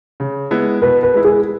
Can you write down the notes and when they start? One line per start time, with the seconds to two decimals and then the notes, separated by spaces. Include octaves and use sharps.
0.20 C#3
0.51 G#3 B3 E4
0.82 B2 B4
1.03 B4
1.14 G#3 E4
1.25 G#4